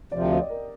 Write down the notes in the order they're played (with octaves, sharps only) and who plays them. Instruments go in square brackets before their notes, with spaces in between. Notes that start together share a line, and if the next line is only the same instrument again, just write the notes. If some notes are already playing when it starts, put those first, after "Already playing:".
[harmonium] D2 C3 F3 [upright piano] D5
[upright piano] G5
D#5
D5
A#4